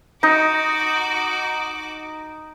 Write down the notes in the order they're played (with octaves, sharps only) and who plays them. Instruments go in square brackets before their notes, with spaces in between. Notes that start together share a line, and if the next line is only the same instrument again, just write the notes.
[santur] D#4 [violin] F#4 D6